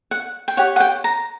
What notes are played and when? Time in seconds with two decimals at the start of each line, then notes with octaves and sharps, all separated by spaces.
0.11 F#5
0.48 G5
0.57 G4 C#5 F#5
0.76 F#5
0.80 G5
1.04 A#5